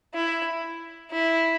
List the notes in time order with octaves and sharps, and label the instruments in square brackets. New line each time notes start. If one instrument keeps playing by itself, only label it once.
[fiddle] E4
E4